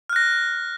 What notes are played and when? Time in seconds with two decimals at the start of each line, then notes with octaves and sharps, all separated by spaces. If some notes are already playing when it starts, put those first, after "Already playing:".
0.09 F6
0.13 F#6
0.16 A#6